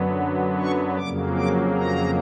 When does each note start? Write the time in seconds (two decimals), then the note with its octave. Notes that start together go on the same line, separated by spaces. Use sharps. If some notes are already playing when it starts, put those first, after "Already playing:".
Already playing: F#2 D3 F#3 B3
0.60 C#6
0.98 F2 C#3 F#3 A#3 D6
1.37 D6
1.76 A#5